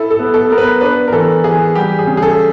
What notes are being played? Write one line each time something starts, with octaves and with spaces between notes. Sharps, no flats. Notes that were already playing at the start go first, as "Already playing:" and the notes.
Already playing: E4 A4
A4
B3
A4
B3 A#4
B4
D4 B4
A#4
E3 A4
E3 G#4
G3 G4
G#4
C#3
G#4
A4